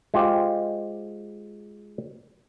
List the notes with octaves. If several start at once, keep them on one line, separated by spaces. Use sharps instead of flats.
G#3 F4 G4 C5